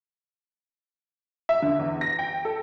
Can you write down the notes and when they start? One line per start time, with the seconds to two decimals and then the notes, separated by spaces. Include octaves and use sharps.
1.49 E5
1.62 D3
1.79 E2
2.01 A#6
2.19 G5
2.45 A4